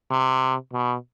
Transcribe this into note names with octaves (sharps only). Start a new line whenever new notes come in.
C3
B2